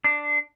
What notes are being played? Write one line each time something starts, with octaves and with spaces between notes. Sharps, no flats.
D4